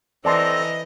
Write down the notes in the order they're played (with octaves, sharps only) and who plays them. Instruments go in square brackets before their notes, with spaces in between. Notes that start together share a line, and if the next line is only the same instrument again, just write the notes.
[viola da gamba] E3 [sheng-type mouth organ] C4 A4 A#5 [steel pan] D5 A5 C6 [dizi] D#5